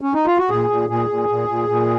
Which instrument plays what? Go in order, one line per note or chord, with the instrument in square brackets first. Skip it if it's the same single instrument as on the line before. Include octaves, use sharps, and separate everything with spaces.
[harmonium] C#4
D#4
F4
F#4
A#2 G#4
A#2
A#2 G#4
A#2
A#2
A#2
A#2